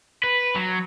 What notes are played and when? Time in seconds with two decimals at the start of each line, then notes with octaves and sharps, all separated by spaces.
0.24 B4
0.55 F#3